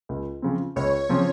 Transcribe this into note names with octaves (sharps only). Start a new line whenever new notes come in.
C#2
C#3 F3 C4
C#2 C#5
C#3 F3 C4